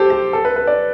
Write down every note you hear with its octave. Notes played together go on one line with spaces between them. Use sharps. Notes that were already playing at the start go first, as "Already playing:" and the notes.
Already playing: G4 A4 C5
G4
A4
B4
B4
D5